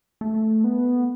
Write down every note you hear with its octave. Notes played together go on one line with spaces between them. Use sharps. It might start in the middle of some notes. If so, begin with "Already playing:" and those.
A3
B3